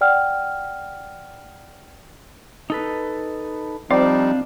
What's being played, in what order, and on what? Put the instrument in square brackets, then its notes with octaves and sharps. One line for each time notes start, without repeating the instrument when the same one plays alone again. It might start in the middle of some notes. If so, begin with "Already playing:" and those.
[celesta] D5 F#5 G5 F6
[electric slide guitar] D#4 A4 B4
[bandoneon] F3 G3 D#4 [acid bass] C4 [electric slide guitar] D4 F5 [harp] D5